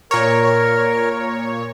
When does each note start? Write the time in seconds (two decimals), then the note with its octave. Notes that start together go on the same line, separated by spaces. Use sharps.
0.11 A#2 A#4 C#5